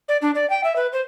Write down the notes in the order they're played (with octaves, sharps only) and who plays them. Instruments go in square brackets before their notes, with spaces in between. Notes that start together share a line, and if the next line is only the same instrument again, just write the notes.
[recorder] D5
D4
D5
G5
E5
B4
C5